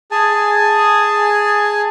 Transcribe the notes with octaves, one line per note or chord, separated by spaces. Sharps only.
G#4 G#5 A5